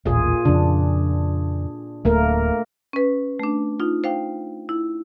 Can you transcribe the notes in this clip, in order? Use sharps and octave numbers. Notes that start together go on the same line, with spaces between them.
D#1 A1 A#2 F4 G#4
F2 C#3 D4
D1 A3 A#3 A#4
C#4 B4
A3 D4
D#4 F4
C5 F5 G5
E4